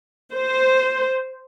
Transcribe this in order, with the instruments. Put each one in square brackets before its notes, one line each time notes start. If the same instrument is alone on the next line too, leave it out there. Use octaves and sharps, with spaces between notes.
[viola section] C5